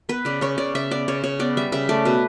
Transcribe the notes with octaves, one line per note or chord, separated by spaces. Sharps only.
B3 B4
C#3 D5
C#3 C#5
C#3 D5
C#3 E5
B3 D5
C#3 C#5
C#3 C#5
B3 D5
G3 E5
C#3 E5
A3 D5
B2 B4